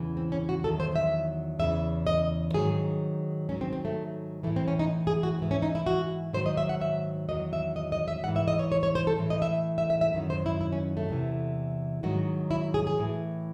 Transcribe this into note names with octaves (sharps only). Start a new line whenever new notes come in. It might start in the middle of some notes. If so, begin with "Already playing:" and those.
Already playing: E2 C#3 E3
C4
C#4
F#4
E2 D#3 F#3 A4
C5
E5
E2 C#3 E3 E5
D#5
G#2 D#3 F#3 G#4
G#2 D#3 F#3 C#4
C4
C4
A3
A2 E3 A3
C4
C#4
D#4
G#4
F#4
G#2 E3
C#4
D#4
E4
F#4
G#2 D#3 F#3 C5
D#5
E5
F#5
E5
E2 D#3 F#3 D#5
E5
D#5
D#5
E5
G#2 E3 F#5
E5
D#5
C#5
C#5
C#5
C5
A4
A2 E3
D#5
E5
E5
E5
E5
F#2 D#3 F#3
C5
E4
E4
C#4
A3
E2 C3 E3
G#2 D#3 F#3 F#4
E4
G#4
G#4
A2 E3